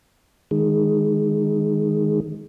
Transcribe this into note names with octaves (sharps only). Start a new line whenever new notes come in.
D#3 G#3